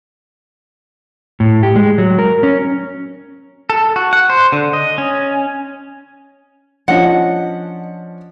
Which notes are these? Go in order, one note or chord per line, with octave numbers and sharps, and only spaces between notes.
A2
G4
G#3
F#3
A#4
C#4
A4
F#4
F#5
C5
D3
D#5
C#4
F3 C#4 D4 D#5 F#5